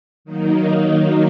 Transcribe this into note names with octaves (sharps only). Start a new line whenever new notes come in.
D#3 F#3 A#3 D#4